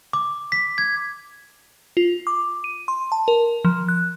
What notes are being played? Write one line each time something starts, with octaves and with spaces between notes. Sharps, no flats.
D6
B6
G#6
F4
D6
D#7
C6
A5
A#4
F3
F#6